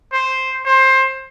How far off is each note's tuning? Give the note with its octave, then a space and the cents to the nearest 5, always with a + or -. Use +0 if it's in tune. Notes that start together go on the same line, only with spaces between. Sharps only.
C5 +5
C5 +20